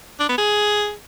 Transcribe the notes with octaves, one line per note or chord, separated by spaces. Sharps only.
D4
B3
G#4